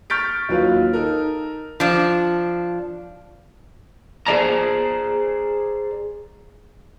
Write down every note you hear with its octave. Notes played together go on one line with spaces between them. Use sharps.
C#6 F6 G6 A6 B6 D7
D#2 F#3 F4 B4
D#4 A4 A#4
F3 D4
G#4 C5 D5 A5 A#5